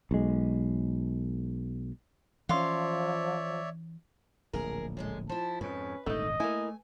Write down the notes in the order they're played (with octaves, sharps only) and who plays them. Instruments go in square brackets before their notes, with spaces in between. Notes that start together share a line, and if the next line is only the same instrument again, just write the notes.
[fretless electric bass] B1 G#3
[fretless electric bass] E3 C#4 [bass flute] F3 [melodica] C#5 D5 E5 [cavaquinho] F5 C6
[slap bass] D1 A#1 [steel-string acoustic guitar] G#4 A#4
[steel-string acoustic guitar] F#2 D3 G#3
[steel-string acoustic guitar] F3 E4 [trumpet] A5
[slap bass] F2 G#2 [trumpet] C#4 [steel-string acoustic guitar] B4
[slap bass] D#1 G#1 D3 [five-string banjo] A3 D#4 [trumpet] D#5
[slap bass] A3 [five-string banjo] A#3 E4 [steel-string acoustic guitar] G#5